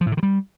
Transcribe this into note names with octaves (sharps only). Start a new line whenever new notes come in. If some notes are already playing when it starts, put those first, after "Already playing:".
F3
A2
D3
D#3
G3